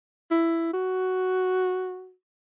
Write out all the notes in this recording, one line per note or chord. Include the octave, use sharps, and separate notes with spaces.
E4
F#4